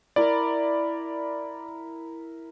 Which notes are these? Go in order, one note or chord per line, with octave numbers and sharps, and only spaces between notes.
E4 A#4 D5